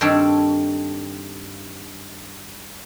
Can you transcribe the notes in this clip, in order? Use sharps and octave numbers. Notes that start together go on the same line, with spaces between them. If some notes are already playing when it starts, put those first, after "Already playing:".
G2 D#3 C4 D4 A4 C#5